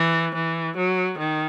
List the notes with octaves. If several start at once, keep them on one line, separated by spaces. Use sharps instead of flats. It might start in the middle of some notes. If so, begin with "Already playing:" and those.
Already playing: E3
E3
F#3
D#3